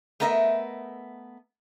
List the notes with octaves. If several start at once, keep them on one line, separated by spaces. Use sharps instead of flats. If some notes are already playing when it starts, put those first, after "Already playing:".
A3 B3 A#4 D#5 E5